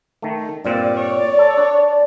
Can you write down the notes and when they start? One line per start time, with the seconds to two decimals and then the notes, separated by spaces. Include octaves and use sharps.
0.22 D#3 A3
0.65 G2 A#2 C4 D5
0.97 C#5
1.39 A4
1.57 D4